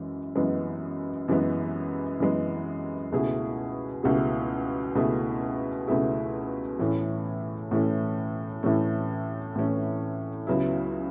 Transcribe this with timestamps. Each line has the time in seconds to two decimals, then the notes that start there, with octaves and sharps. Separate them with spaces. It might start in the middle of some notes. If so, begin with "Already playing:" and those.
Already playing: F#2 E3 G#3
0.36 F#2 E3 G#3 B3
1.28 F#2 E3 G#3 B3
2.20 F#2 E3 G#3 B3
3.12 C#2 B2 A3 E4 G#4
4.03 C#2 B2 A3 E4 G#4
4.95 C#2 B2 A3 E4 G#4
5.87 C#2 B2 A3 E4 G#4
6.79 A2 E3 A3 C#4
7.71 A2 E3 A3 C#4
8.63 A2 E3 A3 C#4
9.55 A2 E3 A3 C#4
10.47 C#2 C#3 F#3 B3 E4